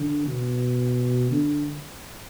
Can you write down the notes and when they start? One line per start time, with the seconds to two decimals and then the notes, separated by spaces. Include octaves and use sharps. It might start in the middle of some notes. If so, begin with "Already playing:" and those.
Already playing: D3
0.27 B2
1.31 D3